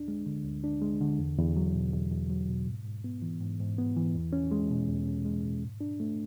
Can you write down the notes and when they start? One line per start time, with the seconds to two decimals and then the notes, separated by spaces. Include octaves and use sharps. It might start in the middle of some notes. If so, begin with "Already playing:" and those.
Already playing: D2 D4
0.08 G#3
0.26 D3
0.45 D2
0.64 D4
0.81 G#3
1.01 D3
1.19 E2
1.38 E2
1.56 F#3
1.74 B2
1.93 E2
2.11 E2
2.30 F#3
2.48 B2
2.67 G#2
2.85 G#2
3.04 B3
3.22 E3
3.41 G#2
3.60 G#2
3.78 B3
3.96 E3
4.14 E2
4.33 C#4
4.51 G#3
4.70 B2
4.89 E2
5.06 C#4
5.25 G#3
5.43 B2
5.62 G#2
5.81 D4
6.00 A3